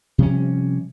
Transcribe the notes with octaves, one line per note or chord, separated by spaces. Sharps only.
C3 F3 G3 C#4